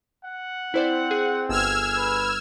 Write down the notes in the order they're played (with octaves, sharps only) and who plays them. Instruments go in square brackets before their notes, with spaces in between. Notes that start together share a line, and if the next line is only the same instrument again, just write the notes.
[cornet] F#5
[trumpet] C4 [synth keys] E4 C5 D5
[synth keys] G#4
[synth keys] G1 [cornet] G#4 [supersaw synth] E6 F6 G#6
[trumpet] B4